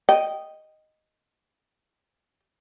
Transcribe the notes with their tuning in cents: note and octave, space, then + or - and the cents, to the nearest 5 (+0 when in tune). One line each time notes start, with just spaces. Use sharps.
D#5 +0 G5 -5